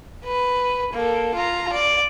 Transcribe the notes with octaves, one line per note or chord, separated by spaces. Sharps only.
B4
A#3 A4
F4 A#5
D5